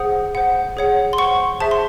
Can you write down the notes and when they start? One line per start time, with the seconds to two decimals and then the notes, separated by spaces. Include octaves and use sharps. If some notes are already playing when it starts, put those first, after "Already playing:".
Already playing: G#4 C5 F#5 D#6
0.35 C5 F#5
0.77 G#4 C#5 F#5
1.13 C6
1.18 C5 F#5 C#6
1.60 G#4 C5 E5 A5
1.71 C6